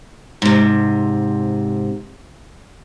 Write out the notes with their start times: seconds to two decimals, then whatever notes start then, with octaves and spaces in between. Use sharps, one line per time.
0.42 G#2 C3